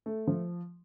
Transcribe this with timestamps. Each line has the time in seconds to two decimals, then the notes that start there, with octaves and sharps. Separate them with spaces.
0.06 A3
0.27 F3